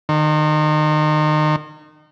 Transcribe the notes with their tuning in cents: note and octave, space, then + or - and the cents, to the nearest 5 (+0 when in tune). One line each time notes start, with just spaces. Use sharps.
D#3 -30